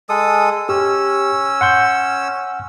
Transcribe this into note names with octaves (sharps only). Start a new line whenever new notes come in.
G#3 A4 D#6
C#4 G4 E6
F#5 C6 G6